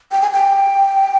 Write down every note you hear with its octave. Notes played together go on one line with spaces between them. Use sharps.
G5
G#5
G5